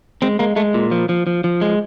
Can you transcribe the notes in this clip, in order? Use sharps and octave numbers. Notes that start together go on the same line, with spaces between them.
G#3 C4
G#3 A#3
G#3 A3
A#2
F3
F3
F3
F3
G#3